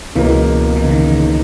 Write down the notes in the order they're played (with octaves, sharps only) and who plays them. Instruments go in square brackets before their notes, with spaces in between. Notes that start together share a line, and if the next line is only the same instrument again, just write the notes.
[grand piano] C#2 B2 A#3 [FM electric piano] E3
[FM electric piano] E3
C#3
D#3
C#3
D#3